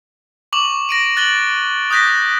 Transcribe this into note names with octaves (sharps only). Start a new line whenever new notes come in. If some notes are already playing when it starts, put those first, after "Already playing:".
C#6 D6 F7 F#7
A#6 D7 D#7
F#6 A6 F#7 G7
D#6 F#6 G6 A#6 B6